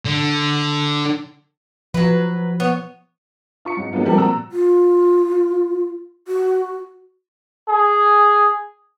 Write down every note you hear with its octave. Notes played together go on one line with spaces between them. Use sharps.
D3
F3 F#3 B4
B3 C#5
F4 C#6 C#7
G#2 F#3
D#3 F#3 G#3 B3 F4
F3 G3 A3 C4 A#4
A#2 F#4 A#5 E6
F4
F#4
G#4